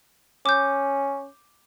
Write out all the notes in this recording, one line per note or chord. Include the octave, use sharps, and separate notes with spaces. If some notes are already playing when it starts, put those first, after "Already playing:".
C#4 D6 G6